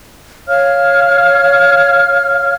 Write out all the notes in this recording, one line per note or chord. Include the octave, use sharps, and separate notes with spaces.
C#5 F5 F6